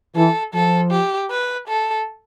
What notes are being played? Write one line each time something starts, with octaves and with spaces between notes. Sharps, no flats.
E3 A4
F3 A4
G4
B4
A4